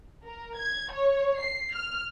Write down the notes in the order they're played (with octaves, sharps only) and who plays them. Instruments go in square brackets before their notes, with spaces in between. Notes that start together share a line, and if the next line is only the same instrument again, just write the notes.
[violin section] A#4
G#6
C#5
C7
F6